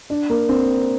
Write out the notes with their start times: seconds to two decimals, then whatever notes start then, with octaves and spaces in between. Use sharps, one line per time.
0.10 D4
0.30 A#3
0.49 C4